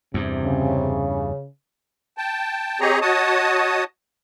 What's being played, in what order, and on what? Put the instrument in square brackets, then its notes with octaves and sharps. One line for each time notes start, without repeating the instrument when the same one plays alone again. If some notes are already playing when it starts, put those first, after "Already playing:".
[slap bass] E2 G2 [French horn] C3
[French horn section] C#3
[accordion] G5 A5
C4 G4 G#4 C#5 D#5 A#5
F#4 C#5 D#5 A5 D#6